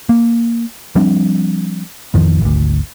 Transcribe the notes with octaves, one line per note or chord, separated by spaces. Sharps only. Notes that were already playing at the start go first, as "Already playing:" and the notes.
A#3
F3 G3 C4 D4
A1 F2 D#3 F3
G#1 D2